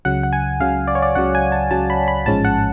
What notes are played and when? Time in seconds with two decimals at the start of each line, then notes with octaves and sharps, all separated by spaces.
0.05 C#2 C#3 F#3 F#5
0.23 F#5
0.33 G#5
0.60 C#2 C#3 F#3 F5
0.87 D5
0.95 C#5
1.02 D5
1.15 C#2 C#3 F#3 F#5
1.35 G#5
1.52 A5
1.71 C#2 C#3 F#3 A5
1.90 B5
2.08 B5
2.26 A1 G#2 F3 G#3 C#4 A5
2.45 F#5